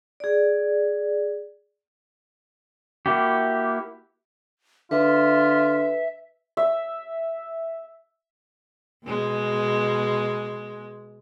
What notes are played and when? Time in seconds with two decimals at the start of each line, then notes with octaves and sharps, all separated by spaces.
0.20 G#4 D5
3.06 A#3 E4 F#4 G4
4.91 D3 F4 B4 E5
6.57 E5
9.06 B2 G#3